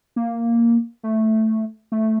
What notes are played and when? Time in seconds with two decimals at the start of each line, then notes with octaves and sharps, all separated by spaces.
0.16 A#3
1.03 A3
1.92 A3